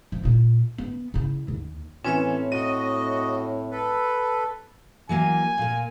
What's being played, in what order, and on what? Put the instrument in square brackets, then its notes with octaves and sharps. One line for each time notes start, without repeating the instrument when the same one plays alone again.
[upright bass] F3
A#2 F4
B3
C#3 E4
D#2
[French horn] A2 [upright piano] E3 C#4 [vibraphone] C4 C#5 E5
[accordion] F#4 D#5 [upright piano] D#7
[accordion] A4 B4
[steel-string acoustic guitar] E3 F#3 A#3 [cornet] G#5
[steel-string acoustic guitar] A#2 A#3